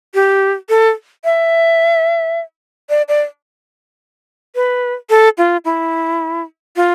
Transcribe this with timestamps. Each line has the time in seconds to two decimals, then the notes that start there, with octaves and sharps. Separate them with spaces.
0.14 G4
0.69 A4
1.24 E5
2.90 D5
3.08 D5
4.55 B4
5.10 A4
5.38 F4
5.65 E4
6.76 F4